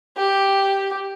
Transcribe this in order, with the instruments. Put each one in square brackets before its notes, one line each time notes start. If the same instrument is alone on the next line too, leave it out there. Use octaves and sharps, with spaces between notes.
[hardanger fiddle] G4